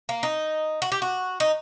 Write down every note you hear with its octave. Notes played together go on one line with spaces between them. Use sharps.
A#3
D#4
F#4
G4
F#4
D#4